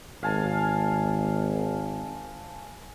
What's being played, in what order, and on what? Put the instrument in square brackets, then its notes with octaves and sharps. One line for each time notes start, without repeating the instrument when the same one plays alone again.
[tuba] G#1 [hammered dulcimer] F5 G#5 A5